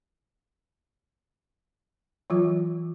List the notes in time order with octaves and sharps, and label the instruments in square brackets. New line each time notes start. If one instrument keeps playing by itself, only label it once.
[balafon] E3 F#3 F4